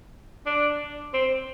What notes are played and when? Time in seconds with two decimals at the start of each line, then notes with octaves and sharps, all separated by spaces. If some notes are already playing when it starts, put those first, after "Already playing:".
0.46 D4
1.14 C4